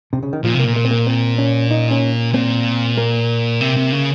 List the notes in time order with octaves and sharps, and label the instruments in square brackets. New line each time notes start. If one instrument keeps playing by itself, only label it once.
[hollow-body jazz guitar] C3
C#3
D#3
[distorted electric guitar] A#2 [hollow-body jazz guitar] F3
[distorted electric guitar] C3
[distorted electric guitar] A#2 [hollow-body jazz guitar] A#3
[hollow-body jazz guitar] A#3
C4
A#3
C4
C#4
D#4
C#4
[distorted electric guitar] A#2 [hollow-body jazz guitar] C4
[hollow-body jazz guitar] A#3
[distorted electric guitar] C3
C3
C#3